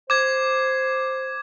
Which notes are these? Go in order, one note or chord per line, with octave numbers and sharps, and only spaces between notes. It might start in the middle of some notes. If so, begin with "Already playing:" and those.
C5 D6 G#6